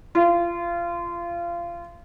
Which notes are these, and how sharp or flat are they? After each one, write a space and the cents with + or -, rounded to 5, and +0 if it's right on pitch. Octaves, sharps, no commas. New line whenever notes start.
F4 -25